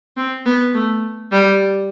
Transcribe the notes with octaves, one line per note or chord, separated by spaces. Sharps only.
C4
B3
A3
G3